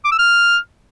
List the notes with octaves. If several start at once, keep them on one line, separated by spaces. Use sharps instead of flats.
D6
E6
F6